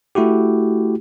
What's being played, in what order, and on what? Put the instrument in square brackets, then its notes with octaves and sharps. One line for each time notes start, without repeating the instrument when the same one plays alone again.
[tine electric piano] A3 E4 F#4 G4